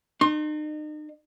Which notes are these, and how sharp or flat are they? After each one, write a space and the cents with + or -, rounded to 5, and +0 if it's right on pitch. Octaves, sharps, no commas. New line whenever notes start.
D#4 -40 C6 +30